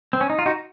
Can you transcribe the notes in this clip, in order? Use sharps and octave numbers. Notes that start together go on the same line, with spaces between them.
C4
C#4
D#4
F4
D#4 F#4